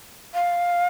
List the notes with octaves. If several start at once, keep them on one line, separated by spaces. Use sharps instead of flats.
F5